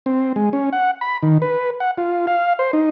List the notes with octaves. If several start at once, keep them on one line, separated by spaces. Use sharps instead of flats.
C4
G#3
C#4
F#5
B5
D#3
B4
F#5
F4
F5
C5
D#4